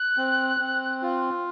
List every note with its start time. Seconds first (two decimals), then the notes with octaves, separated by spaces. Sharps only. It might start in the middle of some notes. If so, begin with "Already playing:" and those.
Already playing: F#6
0.17 C4
0.60 C4
1.02 F4